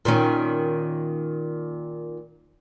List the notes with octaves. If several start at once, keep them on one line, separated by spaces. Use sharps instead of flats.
A#2 D#3 C#4